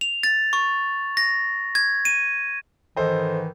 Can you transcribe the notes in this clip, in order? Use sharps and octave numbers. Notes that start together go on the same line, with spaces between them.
F7
A6
C#6
A#6
G#6
D#7
G#2 D#3 E3 A4 C5 D#5